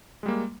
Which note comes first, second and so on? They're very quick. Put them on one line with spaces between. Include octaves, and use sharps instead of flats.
G#3 G3 A#3